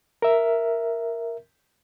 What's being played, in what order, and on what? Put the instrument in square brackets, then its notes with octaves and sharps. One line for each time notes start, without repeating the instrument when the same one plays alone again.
[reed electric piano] A#4 E5